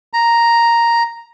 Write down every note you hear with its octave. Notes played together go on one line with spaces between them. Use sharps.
A#5